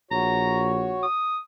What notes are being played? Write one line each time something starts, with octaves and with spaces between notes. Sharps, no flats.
A#1 F#4 C#5 A#5
D#6